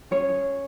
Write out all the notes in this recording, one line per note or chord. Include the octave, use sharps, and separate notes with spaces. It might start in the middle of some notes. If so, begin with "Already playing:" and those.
C#4 G#4 C#5